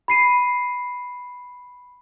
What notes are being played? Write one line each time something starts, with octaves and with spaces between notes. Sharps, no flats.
B5 C7 D#7